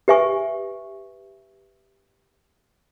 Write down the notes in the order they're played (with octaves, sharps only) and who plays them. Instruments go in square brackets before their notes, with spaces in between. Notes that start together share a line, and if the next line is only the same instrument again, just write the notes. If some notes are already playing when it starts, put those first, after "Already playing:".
[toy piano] G4 B4 E5 G#5 C#6